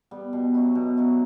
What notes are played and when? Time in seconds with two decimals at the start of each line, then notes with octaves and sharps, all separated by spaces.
0.11 G3 B3
0.33 B2
0.54 F#3 C#4 E4
0.75 B2
0.97 F#3 C#4 E4